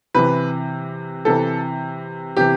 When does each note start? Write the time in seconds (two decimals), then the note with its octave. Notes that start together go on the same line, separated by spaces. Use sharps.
0.14 C3 E3 B4
1.25 C3 E3 A4
2.37 C3 E3 G4